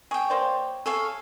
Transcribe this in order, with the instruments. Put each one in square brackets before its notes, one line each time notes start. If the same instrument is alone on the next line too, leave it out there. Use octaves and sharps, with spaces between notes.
[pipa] G#4 [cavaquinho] C#5 G5
[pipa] A#3 C5 D5
[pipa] G#4 [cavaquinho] A4 C#5 F5